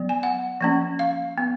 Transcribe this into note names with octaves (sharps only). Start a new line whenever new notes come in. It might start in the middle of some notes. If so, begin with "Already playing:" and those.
Already playing: F#3 B3
G#5
F#5
F3 A#3 C#4
F5
B3